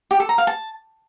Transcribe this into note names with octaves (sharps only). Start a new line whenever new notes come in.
G4
A4
A#5
F5
A5